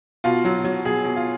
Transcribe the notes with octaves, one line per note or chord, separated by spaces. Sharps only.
B2 F4
F#3
F#3
B2 G#4
B2
F4